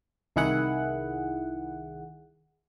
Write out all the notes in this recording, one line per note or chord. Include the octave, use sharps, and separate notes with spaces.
C2 D#3 E4 G#4 F#5